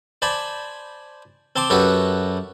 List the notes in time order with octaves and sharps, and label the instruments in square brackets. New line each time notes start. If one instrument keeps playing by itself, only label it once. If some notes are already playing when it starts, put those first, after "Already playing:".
[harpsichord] C5 D5 G#5 A5 B5
C4 A5 C6 D6
F#2 F#4 G4 A4 B4